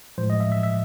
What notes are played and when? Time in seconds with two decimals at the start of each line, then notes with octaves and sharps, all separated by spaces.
0.18 A2 F3 G#3 C5
0.30 D#5
0.40 E5
0.52 E5
0.63 E5